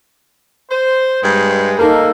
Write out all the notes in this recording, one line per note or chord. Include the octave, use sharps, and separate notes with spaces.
C5
G2 G#3
A#3 D#4 A4 A#4